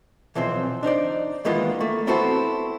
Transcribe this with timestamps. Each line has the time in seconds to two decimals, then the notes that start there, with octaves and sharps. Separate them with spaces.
0.35 B1 E3 F3 C4 C5
0.83 D4 D#4 C5 D5
1.45 D#3 E3 G#3 A#3 B3 F4
1.80 A3 A#3
2.07 B3 C4 E4 F#4 A4 C5